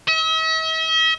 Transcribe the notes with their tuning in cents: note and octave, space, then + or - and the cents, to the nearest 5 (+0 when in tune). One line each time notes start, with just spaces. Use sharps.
E5 -45